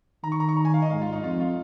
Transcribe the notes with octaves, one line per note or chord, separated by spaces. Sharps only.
D#3 A#5
C#6
A#5
C#6
A#5
G#5
F5
D#5
G#2 F5
F4
D#4
F2 F4
F4